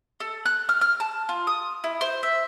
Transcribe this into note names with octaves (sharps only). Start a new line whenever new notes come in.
A4
F#6
F6
F6
A5
F4
D#6
E4
C5
E5